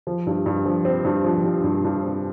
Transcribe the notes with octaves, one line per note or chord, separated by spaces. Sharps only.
F3
G2
G2
F3
C4
G2
F3
G2
G2
G2
C4